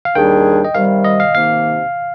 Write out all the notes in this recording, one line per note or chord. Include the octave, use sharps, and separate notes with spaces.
F5
D#2 D#3 G3 D4 G#4 G5
D#5
C3 D#3 G3 F5
D#5
F5
C3 D#3 A#3 D#4 F5